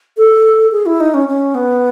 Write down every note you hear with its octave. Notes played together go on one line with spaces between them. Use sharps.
A4
G#4
E4
D#4
C#4
C#4
B3